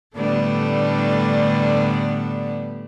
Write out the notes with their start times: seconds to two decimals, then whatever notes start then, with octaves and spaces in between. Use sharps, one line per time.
0.15 A2 D3 G3 A3 B3 D4